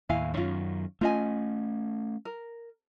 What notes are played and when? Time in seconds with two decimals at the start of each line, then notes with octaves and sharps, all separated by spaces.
0.09 D#2 A2 E4 F5 G#5
0.34 F#2 D#3 C#4 F4
1.01 A3 C#4 F4 D#5 G#5
2.25 A#4